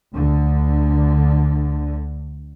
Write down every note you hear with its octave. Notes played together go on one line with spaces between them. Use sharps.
D2 D3